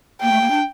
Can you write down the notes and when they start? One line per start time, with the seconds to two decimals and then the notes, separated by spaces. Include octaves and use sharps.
0.22 A#3 G5
0.31 A3
0.41 A#3
0.50 D4